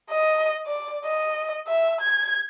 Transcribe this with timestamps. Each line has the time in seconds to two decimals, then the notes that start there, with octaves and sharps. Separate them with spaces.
0.10 D#5
0.67 D5
1.04 D#5
1.67 E5
2.01 G#6